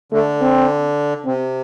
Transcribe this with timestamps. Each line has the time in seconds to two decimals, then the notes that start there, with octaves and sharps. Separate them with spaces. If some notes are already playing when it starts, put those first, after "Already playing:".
0.12 D3 A3
0.41 C4
1.25 C3 C4